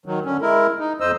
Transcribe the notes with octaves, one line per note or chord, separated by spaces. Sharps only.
D#3 F#3
D3 C#4
G#3 E4 A#4
D#4
F2 C5 D#5 E6